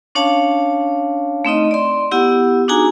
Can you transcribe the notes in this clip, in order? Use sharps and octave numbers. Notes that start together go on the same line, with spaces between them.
C#4 D4 C#5 F5 A5
A3 C4 D#4 D#5
D5 C6
B3 E4 G4 F#5
D4 D#4 F#4 G#4 G#5 A#5